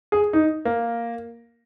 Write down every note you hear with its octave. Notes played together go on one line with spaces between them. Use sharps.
G#4
D#4
A#3